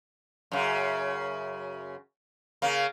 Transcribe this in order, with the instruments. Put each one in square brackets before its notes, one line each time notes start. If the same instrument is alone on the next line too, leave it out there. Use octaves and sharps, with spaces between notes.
[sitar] F#2 C#3
C#3 A#3